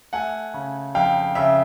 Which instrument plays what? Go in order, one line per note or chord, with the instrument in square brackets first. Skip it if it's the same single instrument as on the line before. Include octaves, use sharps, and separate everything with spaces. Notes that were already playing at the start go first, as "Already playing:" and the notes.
[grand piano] A3 F#5 G#5
C#3
F2 F5 G5
C#3 E5